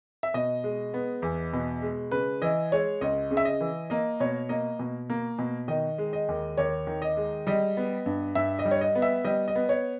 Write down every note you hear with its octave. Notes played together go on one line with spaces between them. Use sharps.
E5
B2 D#5
G#3
B3
E2
B2
G#3
C#3 B4
E3 D#5
G#3 C#5
C#2 D#5
C#3
E5
D#5
E3
A#3 D#5
B2 C#5
A#3 D#5
B2
A#3
B2
D#3 D#5
G#3
D#5
D#2
D#2 C#5
D#3
D#5
G#3
G3 D#5
B3
G2
G2 E5
D#5
G3
C#5
D#5
B3
E5
G3 D#5
D#5
B3
C#5